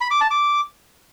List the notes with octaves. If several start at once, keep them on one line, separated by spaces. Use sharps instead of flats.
B5
D6
A5
D6